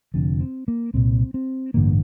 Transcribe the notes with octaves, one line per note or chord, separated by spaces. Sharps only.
F1 F2 D3
C4
A#3
C2 A#2 C4
C4
A1 G2 D3 A#3